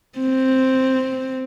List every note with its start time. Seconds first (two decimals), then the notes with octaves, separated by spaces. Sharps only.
0.19 C4